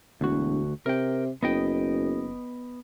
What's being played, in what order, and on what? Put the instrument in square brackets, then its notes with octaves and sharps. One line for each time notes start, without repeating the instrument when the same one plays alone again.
[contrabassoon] E1 [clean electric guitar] D2 F#4
[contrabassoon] C3 [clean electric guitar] A#4 G5
[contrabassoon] F#1 [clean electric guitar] B3 D#5 G5